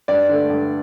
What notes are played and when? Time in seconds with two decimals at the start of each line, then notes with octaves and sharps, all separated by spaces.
0.08 G2 D5
0.29 D3 A3
0.50 G2